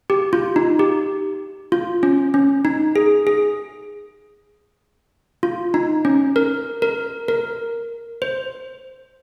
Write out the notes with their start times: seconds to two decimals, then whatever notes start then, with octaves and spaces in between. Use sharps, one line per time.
0.10 G4
0.33 F4
0.56 D#4
0.79 G4
1.72 F4
2.03 C#4
2.34 C#4
2.65 D#4
2.96 G#4
3.27 G#4
5.43 F4
5.74 D#4
6.05 C#4
6.36 A#4
6.82 A#4
7.28 A#4
8.22 C5